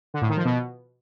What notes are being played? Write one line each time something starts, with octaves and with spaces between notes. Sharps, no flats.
D3
A2
D#3
F3
B2